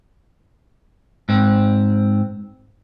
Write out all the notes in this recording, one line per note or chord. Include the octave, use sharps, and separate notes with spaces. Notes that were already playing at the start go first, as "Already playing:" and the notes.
G#2 C4